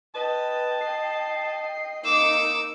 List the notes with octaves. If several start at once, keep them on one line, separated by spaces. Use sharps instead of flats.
B4 D#5 G5 A5
C7
A#3 D#4 D#5 D6 E6